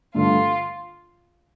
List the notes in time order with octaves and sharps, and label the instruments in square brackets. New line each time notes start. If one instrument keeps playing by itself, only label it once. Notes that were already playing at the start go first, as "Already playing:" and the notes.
[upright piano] G2 D3 A3 [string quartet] F4